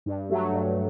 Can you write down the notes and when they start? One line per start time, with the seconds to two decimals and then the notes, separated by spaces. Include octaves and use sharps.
0.06 G2
0.30 F#3 A3
0.53 G2